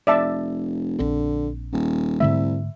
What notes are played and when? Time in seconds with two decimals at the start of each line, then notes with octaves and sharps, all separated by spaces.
0.07 F1 D5 E5 A5
0.99 A#1 D3 C4 D4
1.72 D#1
2.20 C2 G#2 D3 A3 E5